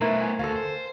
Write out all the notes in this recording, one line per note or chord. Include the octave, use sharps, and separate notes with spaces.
B2 A3 B3 E4 A#4 C5
G#5
D2 A4 F5
C5